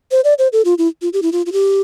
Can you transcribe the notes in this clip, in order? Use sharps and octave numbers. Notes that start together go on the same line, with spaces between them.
C5
D5
C5
A4
F4
E4
F4
G4
E4
F4
F4
G4